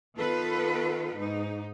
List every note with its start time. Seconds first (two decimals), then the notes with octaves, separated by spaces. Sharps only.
0.17 D#3 B3 F4 A4 B4
1.15 G#2 D#4